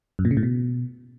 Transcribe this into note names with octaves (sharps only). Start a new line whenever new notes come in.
F#2
A#2
C#3
A2
B2